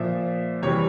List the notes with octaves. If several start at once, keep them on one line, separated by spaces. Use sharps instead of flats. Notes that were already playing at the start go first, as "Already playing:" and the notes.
Already playing: A#2 F3 E5
C3 E3 G3 C#5